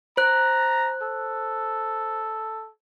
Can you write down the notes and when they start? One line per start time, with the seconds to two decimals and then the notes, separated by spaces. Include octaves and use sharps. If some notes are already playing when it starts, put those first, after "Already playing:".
0.17 C5 A#5 F#6
1.02 A4